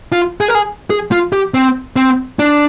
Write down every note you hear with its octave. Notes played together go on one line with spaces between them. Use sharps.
F4
G#4
A#4
G#4
G#4
F4
G4
C4
C4
D4